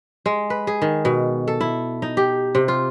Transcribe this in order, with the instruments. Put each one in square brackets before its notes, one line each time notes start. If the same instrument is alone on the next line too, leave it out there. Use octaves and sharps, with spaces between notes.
[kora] G#3
B4
G#4
D#3
B2
A4
E4
D#4
G4
C3
F4